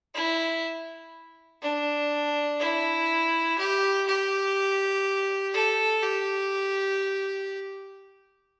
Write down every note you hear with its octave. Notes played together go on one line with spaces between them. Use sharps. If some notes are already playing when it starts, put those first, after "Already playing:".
E4
D4
E4
G4
G4
A4
G4